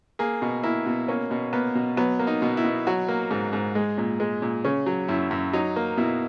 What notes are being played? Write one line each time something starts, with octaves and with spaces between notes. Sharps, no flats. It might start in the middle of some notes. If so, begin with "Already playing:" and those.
A#3 G#4
B2
A#3 E4
B2
A#3 C#4
B2
A#3 B3
B2
F#3 B3
A#3
D#4
B2
E4
B2
F#3 F#4
A#3
G#2
G#2
G#3
A#2
G#3
A#2
C#3 C#4
F#3
F#2 E4
F#2
F#3 D#4
A#3
B2 E4